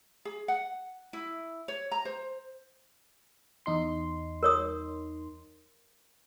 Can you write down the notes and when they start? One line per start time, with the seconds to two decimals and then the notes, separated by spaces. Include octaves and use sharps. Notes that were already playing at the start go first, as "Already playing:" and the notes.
0.25 G#4
0.48 F#5
1.13 E4
1.68 C#5
1.91 A#5
2.05 C5
3.66 E2 D#4 C6
4.43 A#4 C#5 D#6